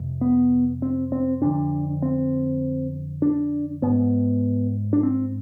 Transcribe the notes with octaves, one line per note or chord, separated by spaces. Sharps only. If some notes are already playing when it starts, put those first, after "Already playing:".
Already playing: F2 C3
B3
C4
C4
F2 D3 D4
C4
D4
G#2 B3
D4
C4